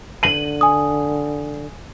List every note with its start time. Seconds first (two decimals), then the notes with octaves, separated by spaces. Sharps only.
0.23 D3 D#7 F#7
0.61 G#5 D#6